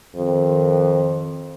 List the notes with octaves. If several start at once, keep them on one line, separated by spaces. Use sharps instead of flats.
F2 D#3